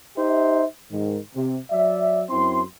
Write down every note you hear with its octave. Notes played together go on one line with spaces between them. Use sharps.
D#4 G4 C5 E5
G#2 D#3
C3
F#3 D5 E5
F#2 C4 E4 C6